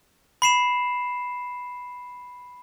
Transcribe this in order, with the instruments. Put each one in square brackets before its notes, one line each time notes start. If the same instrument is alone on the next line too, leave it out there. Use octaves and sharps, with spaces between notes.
[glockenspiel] B5 C7 E7